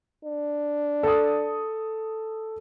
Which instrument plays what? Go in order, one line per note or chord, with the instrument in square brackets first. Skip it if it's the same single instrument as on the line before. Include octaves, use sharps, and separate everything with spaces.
[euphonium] D4
[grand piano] A4 D#6